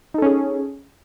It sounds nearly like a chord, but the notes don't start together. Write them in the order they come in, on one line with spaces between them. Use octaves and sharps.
D#4 A4 C#4 G#4